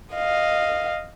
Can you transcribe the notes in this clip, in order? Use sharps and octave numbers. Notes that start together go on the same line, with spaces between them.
D#5 F5